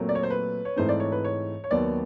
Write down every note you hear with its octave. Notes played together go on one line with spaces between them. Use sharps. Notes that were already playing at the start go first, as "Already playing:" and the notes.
Already playing: A#2 F#3 A3 C4 A#4
D5
C#5
C5
B4
C#5
G#2 E3 A3 C4 C5
D5
C#5
B4
C#5
C#5
D#2 D#3 F#3 B3 D5